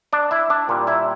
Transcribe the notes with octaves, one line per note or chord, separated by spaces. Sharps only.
D4 D5
E4 E5
D4 D5
A#2 G3
E4 E5